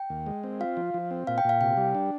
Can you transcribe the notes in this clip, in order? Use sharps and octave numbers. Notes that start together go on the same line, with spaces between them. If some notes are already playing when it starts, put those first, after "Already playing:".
Already playing: G5
D#2
G#3
C4
F4 F5
F3
F3
C4
A#2 F5
G5
A#2 F5
C3 G5
G3
D4